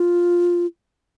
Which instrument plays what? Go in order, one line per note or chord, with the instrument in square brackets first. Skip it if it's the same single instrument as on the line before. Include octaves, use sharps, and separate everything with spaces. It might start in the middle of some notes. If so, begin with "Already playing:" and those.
Already playing: [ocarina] F4